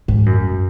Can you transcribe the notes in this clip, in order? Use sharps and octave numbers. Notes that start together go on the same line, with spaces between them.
G#2
F#2